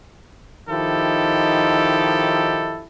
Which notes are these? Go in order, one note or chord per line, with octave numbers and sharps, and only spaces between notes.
D#3 F3 D#4 E4 G4 A4